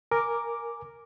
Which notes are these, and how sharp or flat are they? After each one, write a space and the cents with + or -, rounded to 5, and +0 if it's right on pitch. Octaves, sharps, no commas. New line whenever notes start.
A#4 +0 G#5 +0 D6 +0